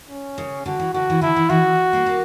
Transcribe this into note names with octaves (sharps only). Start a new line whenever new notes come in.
C#4
C#3
D3 F#4
E3
D3 F#4
E3
D3 E4
E3
E3 F#4
A#3
A#3